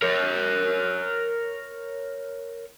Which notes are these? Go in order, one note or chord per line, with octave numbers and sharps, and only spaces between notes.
A#4 C#5